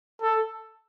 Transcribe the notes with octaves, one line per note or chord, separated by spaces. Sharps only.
A4